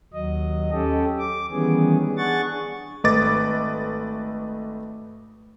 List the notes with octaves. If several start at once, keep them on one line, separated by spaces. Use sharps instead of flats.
D#2 F#3 D#5
C#4 G4 A4
D6
D#3 E3 G3 B3 C#4 G#4
D4 G#4 F#5 C#6 A6
G#1 A3 B4 D#5 D6 A6